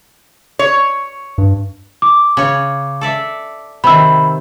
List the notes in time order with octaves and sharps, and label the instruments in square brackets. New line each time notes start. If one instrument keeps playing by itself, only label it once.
[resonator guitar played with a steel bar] C#5
[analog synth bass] G2
[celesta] D6
[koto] C#3 C#5
A4 D5 E5
[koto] C3 D#3 [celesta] B5 E6